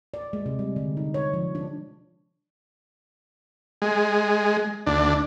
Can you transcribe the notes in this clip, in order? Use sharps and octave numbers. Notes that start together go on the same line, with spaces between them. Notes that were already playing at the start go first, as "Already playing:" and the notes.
D5
G#3
C3
G3
D3
D#4
C#5
F3
D4
G#3
D2 D4